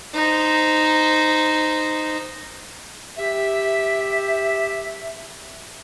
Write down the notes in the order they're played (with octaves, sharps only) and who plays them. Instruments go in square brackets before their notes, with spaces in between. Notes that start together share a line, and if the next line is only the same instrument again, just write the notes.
[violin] D#4 C5
[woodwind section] G4 E5